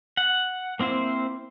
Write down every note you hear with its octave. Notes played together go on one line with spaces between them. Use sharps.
F#5
A#3 C4 E4 C5